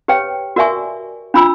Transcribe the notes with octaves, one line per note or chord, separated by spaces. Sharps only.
G4 B4 C#5 G5
F#4 A#4 D5 E5 G#5 C#6
D4 F4 B5 E6